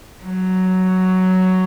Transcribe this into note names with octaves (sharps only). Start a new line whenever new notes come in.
F#3